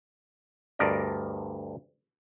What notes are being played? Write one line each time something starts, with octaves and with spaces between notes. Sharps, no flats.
D2 G2 A#4 D5 D#5